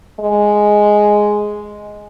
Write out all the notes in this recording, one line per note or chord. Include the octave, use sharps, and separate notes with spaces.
G#3